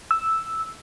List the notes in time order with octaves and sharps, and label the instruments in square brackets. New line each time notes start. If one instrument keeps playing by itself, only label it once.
[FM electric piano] E6